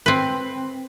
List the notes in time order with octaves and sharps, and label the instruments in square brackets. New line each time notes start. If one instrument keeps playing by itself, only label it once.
[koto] C4 B4